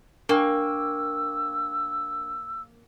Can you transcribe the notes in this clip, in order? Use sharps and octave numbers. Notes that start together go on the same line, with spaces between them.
A#3 D4 G5 C#6 E6